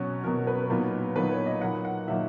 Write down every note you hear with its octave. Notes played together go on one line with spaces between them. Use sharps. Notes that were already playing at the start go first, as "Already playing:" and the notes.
Already playing: B2 F#3 C#4
B2 F#3 C#4 A#4
B4
A#2 F#3 B3 D#4
A#2 F#3 B3 D#4 B4
C#5
D#5
A#2 F#3 A#3 D#4 F#5
F#5
A#2 F#3 A#3 D#4 E5